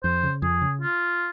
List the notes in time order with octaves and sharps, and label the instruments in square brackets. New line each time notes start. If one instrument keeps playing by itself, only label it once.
[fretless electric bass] F2 [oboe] C5
[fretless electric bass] C#3
[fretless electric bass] F2 [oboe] G#4
[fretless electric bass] C#3
[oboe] F4